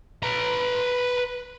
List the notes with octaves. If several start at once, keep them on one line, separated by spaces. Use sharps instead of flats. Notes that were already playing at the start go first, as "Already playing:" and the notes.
B4 A#5